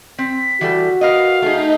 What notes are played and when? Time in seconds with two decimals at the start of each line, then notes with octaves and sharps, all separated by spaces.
0.18 C4 B6
0.61 E3 G3 F#4 A4
1.01 A#4 B4 D#5 F5
1.42 A3 D#4 G#4